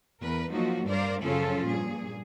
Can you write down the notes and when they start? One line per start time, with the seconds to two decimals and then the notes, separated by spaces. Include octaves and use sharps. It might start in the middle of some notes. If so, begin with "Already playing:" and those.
0.21 E2 A#4 B4
0.52 F3 F#3 A#3 D#4 F#4
0.87 G2 A#4 C5 D5 F5
1.22 F#2 C#3 F3 C#4 F4 A4
1.66 G2 A#2 G#4